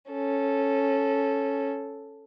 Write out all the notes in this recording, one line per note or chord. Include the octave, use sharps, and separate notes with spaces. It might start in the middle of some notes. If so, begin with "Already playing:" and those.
C#4 A4